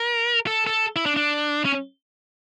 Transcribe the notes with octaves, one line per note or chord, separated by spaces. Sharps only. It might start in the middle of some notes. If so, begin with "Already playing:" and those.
Already playing: A#4
A4
A4
E4
D4
D4
C#4